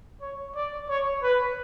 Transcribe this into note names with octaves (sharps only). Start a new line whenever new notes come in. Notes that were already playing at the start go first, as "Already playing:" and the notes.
C#5
D5
C#5
B4